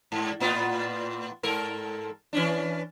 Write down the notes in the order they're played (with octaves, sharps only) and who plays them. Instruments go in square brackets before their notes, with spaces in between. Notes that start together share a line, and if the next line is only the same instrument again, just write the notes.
[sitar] G#2
A2 B3 F4
G#2 A4 A#4
E3 C#4 D4